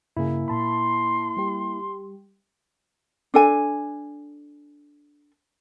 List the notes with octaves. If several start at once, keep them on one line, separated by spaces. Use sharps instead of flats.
G2 C#3 A#3 E4 G#4
A#2 A5 B5 C6
G3 G4
D4 A4 G#5